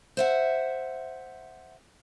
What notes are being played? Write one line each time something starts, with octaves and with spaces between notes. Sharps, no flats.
C5 E5 F#5